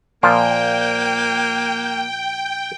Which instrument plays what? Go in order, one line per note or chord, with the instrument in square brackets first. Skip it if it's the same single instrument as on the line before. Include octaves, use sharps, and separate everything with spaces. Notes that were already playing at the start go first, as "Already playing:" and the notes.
[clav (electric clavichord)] A#2 F3 F4 [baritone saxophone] A#3 [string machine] G5